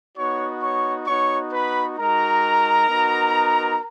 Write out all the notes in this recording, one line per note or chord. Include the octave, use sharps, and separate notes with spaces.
B3 D#4 F#4 C#5 C#6
C#5 C#6
B3 D#4 F#4 C#5 C#6
B4 B5
G#3 D#4 F#4 A#4 A#5
B3 D#4 F#4